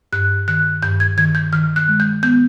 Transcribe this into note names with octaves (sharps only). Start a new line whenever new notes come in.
G2 F#6
D#3 F#6
G2 G6
G#6
D#3 G#6
G6
D#3 F6
F#6
G#3
G6
B3 G6